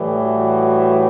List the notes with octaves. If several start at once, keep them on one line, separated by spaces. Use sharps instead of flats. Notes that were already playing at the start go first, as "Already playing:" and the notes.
Already playing: A2 E3 G3
F#4